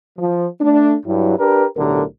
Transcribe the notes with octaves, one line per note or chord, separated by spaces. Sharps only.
F3
A3 D4
G2 F#3 E4
D4 G4 A#4 B4
B1 A2 D3 G4 A#4